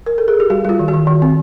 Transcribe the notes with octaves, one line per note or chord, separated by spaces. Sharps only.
A#4
A4
G#4
G4
G3 F#4
G3 F4
D#3
F#4
D#3
D#3
C4